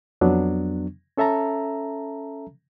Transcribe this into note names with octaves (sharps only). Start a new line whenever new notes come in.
F2 F#3 B3 D4
C#4 A4 E5 A5 A#5